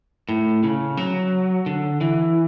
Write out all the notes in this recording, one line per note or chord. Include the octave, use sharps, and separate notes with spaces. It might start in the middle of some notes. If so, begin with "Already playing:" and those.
A2
C#3
F#3
D3
E3